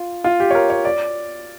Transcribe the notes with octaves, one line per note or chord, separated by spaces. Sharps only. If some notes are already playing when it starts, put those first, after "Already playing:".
Already playing: F4
F4
G4
C#5
A#4
C#5
D5